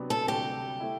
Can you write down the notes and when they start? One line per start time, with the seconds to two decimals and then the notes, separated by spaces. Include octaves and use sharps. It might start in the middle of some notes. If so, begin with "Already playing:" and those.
Already playing: C3 F#3 B3 D4
0.10 A4
0.28 D2 C3 G3 D4 F#4 G4
0.80 A3 E4